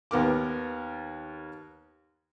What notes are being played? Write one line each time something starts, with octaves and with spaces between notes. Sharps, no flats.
D#2 B3 A#4 D6